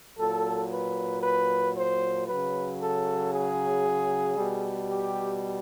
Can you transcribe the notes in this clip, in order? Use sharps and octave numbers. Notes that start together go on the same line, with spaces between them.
A#2 F#3 A4
B4
B4
C5
C#3 F#3 B4
A4
G#4
B2 G3
G4